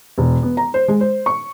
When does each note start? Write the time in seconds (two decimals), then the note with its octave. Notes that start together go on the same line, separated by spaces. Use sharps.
0.18 E1
0.43 B3
0.57 A#5
0.74 C5
0.88 G#3
1.01 C5
1.26 C#6